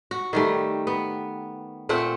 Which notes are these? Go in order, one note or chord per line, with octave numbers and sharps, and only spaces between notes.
F#4
D#3 G3 A3
B3
A#2 A3 C4 F#5